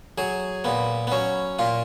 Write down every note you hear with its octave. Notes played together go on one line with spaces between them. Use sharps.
F#3 G#4
A#2 B3
B3
F#3 C#4
A#2 F4